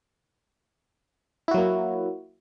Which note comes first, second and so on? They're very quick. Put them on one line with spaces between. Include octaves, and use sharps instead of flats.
E4 F#4 F#3 A#3